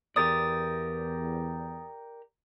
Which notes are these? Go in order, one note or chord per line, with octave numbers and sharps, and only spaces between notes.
E2 G4 A#4 D5 D#6 A6